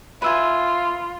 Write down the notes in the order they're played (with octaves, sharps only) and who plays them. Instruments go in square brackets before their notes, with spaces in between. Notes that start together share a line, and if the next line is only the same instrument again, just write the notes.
[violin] F4 [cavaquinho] B4 E5 G#5